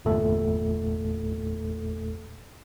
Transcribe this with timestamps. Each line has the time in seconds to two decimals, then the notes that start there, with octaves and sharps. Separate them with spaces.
0.05 G1 E2 A#2 A3 A4